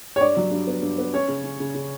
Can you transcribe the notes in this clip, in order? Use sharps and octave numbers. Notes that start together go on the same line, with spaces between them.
C#5
G2 D5
F#3
G2
B3
G2
B3
C#4 C#5
C#3
C#4
C#3
C#3